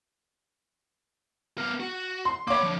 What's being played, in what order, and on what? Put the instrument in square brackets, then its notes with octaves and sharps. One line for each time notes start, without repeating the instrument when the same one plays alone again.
[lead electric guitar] B3 A#4
F#4
[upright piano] C6
[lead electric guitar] A#3 B5 [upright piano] C#5 D6
[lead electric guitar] D3 F3